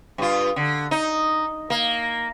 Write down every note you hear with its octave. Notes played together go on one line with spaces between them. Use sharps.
G2 F4
D3
D#4
A#3